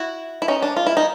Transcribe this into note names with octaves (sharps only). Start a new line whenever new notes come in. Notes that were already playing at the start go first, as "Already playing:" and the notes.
Already playing: E4 F#4
E4
C#4 D#4
D4
F4
E4
D#4